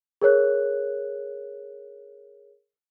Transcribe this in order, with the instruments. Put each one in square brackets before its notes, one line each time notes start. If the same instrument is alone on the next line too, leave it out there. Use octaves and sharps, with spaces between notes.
[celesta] G#4 A#4 C#5 F#6